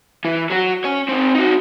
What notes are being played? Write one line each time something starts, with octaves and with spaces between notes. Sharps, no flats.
E3
F#3 F#4
C#4 C#5
C4 D#4
D#4 F#4